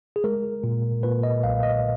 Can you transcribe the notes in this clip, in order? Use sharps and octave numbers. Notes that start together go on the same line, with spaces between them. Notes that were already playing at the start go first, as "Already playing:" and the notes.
G#4
G#3 A#4
A#2
A#2 B4
D#5
B1 F5
D#5